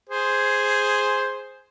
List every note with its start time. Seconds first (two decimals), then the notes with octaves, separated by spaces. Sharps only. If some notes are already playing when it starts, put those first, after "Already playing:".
0.09 G#4 C5